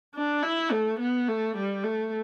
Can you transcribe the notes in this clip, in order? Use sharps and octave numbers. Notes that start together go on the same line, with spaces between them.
D4
E4
A3
B3
A3
G3
A3